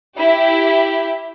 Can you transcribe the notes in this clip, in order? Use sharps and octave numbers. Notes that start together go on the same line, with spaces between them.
E4 G4 E5